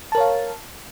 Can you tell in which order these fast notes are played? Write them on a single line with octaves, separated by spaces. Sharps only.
A5 A#4 C#5 F5